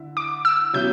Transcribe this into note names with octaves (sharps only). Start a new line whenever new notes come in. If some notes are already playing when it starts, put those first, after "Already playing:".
Already playing: D3 E4
D6
E6
C#3 F#3 B3 E4 G6